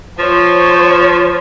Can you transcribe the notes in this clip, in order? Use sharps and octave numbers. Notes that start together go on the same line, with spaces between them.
F3 C5 C#5